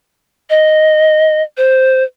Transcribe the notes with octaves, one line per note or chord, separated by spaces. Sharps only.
D#5
C5